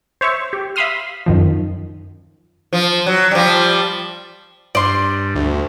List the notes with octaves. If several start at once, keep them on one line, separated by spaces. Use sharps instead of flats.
C5 C#5 E5 C#6
G4
E5 F5 B5 C6 D#6 F6
F#2 D#3 F3
F3
F#3
F3 G3
G2 D5 C6
D2